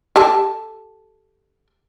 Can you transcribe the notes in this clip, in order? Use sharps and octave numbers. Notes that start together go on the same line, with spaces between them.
G4 A4 A5